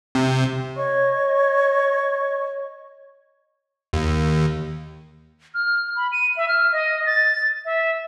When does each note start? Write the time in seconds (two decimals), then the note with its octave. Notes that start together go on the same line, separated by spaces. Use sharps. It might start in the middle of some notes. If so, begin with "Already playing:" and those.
0.15 C3
0.76 C#5 D#5 C#6
3.93 D#2
5.54 F6
5.96 B5
6.12 D#7
6.37 E5
6.48 F6
6.72 D#5
7.06 A6
7.65 E5